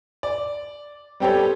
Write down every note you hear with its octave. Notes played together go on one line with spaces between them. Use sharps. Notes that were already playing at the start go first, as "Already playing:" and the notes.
D5
G3 B3 C4 G4 A4 C#5